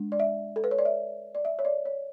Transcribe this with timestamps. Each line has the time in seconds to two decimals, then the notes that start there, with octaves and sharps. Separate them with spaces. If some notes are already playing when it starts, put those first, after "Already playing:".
Already playing: G#3 D4
0.12 D5
0.20 E5
0.56 A4
0.64 B4
0.71 C#5
0.79 D5
0.85 E5
1.35 D5
1.45 E5
1.59 C#5
1.65 D5
1.85 C#5